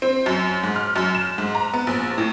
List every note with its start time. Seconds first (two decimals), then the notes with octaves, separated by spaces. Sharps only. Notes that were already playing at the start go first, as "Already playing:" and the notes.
0.02 C4
0.26 F#2
0.64 G#2
0.76 F6
0.96 F#2
1.15 E7
1.38 G#2
1.55 A#5
1.74 B3
1.87 A#1
2.18 A2